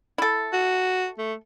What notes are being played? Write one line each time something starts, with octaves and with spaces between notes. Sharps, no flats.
E4 A4
F#4
A3